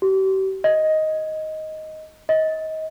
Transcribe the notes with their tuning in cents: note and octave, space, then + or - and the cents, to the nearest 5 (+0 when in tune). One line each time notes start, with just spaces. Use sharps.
G4 -40
D#5 +5
D#5 +25